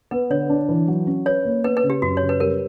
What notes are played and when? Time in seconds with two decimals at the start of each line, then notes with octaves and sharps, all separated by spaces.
0.11 B3 B4
0.30 D3 C#5
0.50 D4
0.69 E3
0.88 F#3
1.07 C#4
1.26 B4 C#5
1.45 A#3
1.64 B3 B4
1.77 B4
1.83 C#3
1.90 G4
2.02 F#2 F#4
2.17 C#3 C#5
2.29 B4
2.40 G3 A#4